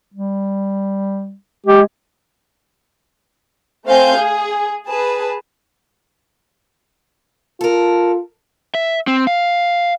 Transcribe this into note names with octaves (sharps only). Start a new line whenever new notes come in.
G3
G#3 G4
A3 C4 F5 G#5 G6
G#4
G#4 B4 A5
F4 A4 A#4
E5
C4
F5